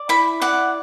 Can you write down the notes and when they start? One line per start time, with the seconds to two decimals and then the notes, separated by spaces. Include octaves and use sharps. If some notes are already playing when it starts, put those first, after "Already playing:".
Already playing: D5
0.09 E4 B5
0.42 D5 F#5